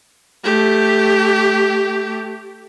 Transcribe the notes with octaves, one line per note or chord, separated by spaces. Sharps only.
A3 G4